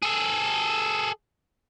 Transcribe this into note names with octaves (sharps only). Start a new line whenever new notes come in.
G#4 A4